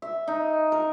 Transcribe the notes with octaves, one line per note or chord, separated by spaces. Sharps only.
E5
D#4
A#4